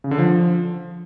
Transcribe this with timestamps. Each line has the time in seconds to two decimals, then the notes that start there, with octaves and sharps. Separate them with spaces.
0.04 C#3
0.11 D3
0.18 F3